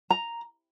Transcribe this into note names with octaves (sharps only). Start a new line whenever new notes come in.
A#5